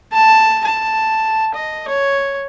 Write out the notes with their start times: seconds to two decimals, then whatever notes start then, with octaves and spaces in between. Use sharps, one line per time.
0.13 A5
0.65 A5
1.55 D#5
1.88 C#5